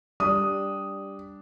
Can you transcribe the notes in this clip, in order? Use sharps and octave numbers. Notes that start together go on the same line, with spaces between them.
G3 D4 D#6